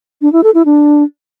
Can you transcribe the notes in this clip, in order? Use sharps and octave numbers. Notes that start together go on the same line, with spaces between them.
D4
E4
A4
E4
D4